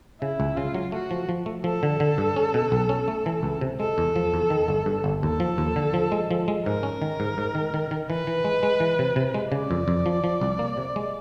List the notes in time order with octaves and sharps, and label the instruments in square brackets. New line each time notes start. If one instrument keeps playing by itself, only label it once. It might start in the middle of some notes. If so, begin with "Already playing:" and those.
[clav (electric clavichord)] C#3 [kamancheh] E4
[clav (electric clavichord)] C#2
[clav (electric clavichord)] C#3 [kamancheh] F4
[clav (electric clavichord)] F#3
[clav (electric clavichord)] A3 [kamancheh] F#4
[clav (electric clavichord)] F3
F3
A3
[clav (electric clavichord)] F3 [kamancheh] A4
[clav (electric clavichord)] D3
D3
G2
C#4
B2
B1
C#4
A3
E3
C#2
C3
[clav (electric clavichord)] G#3 [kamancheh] A4
[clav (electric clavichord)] E2
F3
E2
D#3
G1
G2
G1
[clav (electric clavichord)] D#2 [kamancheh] A4
[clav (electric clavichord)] F3
D#2
D3
F3
G#3
F3
G#3
[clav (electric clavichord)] G#2 [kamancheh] A#4
[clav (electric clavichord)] C#4
D#3
G#2
G#2
D#3
D#3
D#3
[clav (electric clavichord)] E3 [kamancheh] B4
[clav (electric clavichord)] E3
G#3
G#3
E3
C3
C3
G#3
[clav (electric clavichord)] C#3 [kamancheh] D5
[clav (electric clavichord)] F2
F2
F3
F3
C2
A#3
C3
G#3